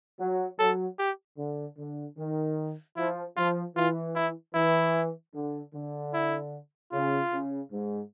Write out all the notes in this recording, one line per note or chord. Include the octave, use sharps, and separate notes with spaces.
F#3
F#3 A4
G4
D3
D3
D#3
F3 E4
F3 F4
E3 F4
E4
E3 E4
D3
D3
E4
C#3 F4
C#3
G#2